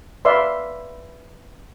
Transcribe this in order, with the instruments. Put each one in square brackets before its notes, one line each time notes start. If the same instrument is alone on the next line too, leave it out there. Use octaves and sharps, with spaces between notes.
[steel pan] B4 D5 E5 F5 C6